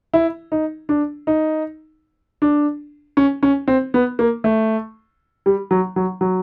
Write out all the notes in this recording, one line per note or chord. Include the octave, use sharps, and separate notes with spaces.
E4
D#4
D4
D#4
D4
C#4
C#4
C4
B3
A#3
A3
G3
F#3
F#3
F#3